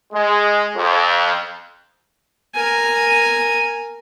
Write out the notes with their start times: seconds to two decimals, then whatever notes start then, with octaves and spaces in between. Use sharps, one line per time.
0.13 G#3
0.76 F2
2.55 A#4 G#5